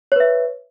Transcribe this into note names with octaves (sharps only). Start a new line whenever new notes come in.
B4 C#5 E5